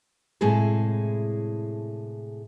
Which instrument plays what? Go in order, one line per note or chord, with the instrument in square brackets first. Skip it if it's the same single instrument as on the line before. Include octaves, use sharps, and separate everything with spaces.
[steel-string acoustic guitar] A2 C3 G#3 E4 G#4 A4